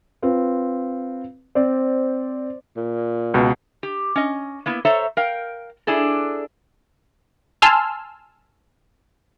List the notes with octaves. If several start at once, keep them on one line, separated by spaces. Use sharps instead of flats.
C4 F4 B4
C4 C5 D5
A#2
C#2 B2
G4
C#4 D#5
A#3 B3 E4
A4 C5 C#5 E5 A#5
A#4 F5 G5
D4 E4 G#4 A4
G#5 A5 C6 E6 F6